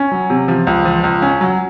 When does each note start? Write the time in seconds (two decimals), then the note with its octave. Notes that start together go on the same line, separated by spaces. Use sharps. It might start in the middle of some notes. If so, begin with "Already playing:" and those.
Already playing: C#4
0.12 F#3
0.30 C3
0.48 F3
0.67 C#2
0.85 F3
1.04 C#2
1.22 C#4
1.41 F#3